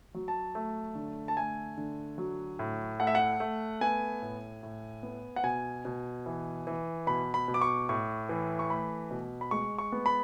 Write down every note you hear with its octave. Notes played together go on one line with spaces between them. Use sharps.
F#3
A5
A3
D3
A5
A3 G#5
D3
F#3
A2
A3 F#5
E5
F#5
A3
B3 G#5
A2
A2
B3
F#5
B2 G#5
B2
E3
E3
B2 B5
B5
B2
D6
C#6
A2 C#6
E3
C#6
A3 B5
B2
B5
G#3 C#6
C#6
B3
B5